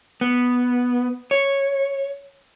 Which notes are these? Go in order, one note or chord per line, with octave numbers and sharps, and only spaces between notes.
B3
C#5